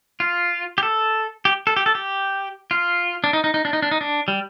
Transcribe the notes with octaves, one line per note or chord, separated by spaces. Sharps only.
F4
G4
A4
G4
A4
G4
A4
G4
F4
D4
D#4
D#4
D#4
D4
D#4
D4
D#4
D4
G3